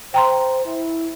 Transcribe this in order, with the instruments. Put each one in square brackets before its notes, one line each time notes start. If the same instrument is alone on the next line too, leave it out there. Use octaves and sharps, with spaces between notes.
[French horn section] C5 [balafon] G5 A#5 C6
[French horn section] E4